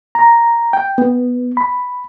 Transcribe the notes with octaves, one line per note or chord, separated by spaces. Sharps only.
A#5
G5
B3
B5